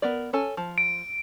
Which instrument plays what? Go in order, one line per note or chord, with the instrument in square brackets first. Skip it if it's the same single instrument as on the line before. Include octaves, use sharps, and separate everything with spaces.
[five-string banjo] B3 A#4 D5
C#4 A4 G#5
F3
[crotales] D7